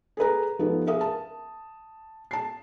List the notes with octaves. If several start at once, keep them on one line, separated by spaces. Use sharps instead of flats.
G#4 A4 B4 A#5
F3 B3 D#4 G4 A4
G#4 A#4 E5 F5 D#6
A5
A5 C7